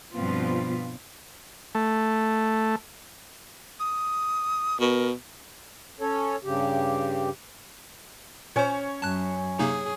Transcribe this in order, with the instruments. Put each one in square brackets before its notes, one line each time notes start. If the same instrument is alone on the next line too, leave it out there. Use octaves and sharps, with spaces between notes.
[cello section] G2 B2 F3 B3 C4 F4
[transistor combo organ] A3
[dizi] D#6
[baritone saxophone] B2 [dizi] A#4
[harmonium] C#4 A4 C#5
G2 C#3 G4
[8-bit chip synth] A#2 C5 [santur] C#4 C#5
[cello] F#2 [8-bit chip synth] A5 F#6
[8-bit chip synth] C3 A#3 D#4 [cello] G#4